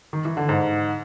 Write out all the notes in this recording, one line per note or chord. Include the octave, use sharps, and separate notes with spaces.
D#3
E3
D3
G#2